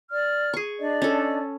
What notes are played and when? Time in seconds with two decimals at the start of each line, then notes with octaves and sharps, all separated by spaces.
0.10 D5 F6
0.53 G#4 C#6
0.80 D4 D5 D#5
1.02 C#4 A4